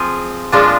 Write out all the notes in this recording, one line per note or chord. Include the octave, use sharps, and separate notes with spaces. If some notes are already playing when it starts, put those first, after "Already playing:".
Already playing: F3 C4 F4 G#4
A#2 F3 G#3 D4 F4